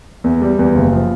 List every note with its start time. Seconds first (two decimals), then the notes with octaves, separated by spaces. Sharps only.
0.24 E2
0.42 G3
0.59 E2
0.75 F#1
0.93 F3